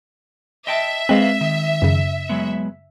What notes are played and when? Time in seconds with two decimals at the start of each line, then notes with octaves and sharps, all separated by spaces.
0.67 D#5 E5 G5 A5
1.09 G#3 C4 B4 D#5 F5
1.41 D#3
1.82 F#2 C#3
2.29 F#3 G#3 B3